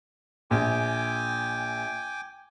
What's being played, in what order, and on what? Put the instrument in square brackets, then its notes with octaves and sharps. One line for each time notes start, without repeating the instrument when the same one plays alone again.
[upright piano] A#1 [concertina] G5 G#5 D6